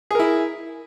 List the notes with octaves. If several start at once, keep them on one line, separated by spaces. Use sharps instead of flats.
E4 G#4 A#4